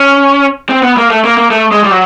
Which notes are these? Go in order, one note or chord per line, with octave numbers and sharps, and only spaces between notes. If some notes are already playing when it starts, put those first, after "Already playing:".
Already playing: C#4
C4
B3
A#3
A3
A#3
A#3
A3
G#3
G3
F#3